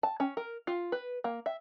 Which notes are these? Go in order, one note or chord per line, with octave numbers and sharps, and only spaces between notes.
A5
C#4
A#4
F4
B4
A#3
E5